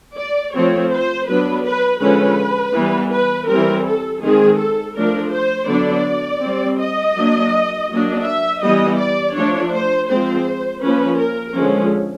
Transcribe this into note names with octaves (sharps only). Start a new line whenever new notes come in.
D5
F3 A3 C4 C#5
C5
F#3 B3 D4 B4
B4
D3 F3 G#3 C#4 B4
E3 G3 B3
B4
E3 G3 C4 A#4
A4
D#3 G#3 C4 G#4
A4
F3 A3 D4 A#4
C5
D3 F#3 B3 D4 D5
G3 C4
D#5
F#3 A#3 D4
F#3 A#3 D4
E5
E3 G3 B3 D#5
D5
F3 A3 D4 C#5
C5
F3 G#3 C4 C5
F3 A#3 C#4 B4
A#4
D3 F3 G#3 C#4